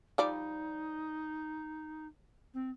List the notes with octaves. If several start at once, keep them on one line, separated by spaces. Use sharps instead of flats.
F3 G3 D#4 D5
C4